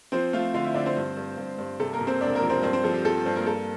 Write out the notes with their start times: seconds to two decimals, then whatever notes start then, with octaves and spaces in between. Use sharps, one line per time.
0.12 F3 C4 C5
0.33 A3 F4 F5
0.54 D3 F4 F5
0.64 E4 E5
0.75 D3 D4 D5
0.86 C4 C5
0.96 G2
1.17 G2
1.38 G2
1.58 G2
1.80 C3 A4
1.93 A#3 A#4
2.01 C3
2.07 C4 C5
2.21 E1 D4 D5
2.35 A#3 A#4
2.42 F3
2.50 C4 C5
2.63 G2 C4 C5
2.73 C4 C5
2.84 F3 A4
2.94 G4
3.05 F3 A4
3.25 G2 C4 C5
3.36 A#3 A#4
3.46 A#3 A4